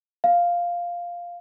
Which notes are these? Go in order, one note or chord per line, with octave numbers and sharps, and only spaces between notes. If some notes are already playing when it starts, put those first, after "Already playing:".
F5